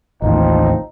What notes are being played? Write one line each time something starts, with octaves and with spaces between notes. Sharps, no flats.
A1 D#2 A2 F3 C4 D#4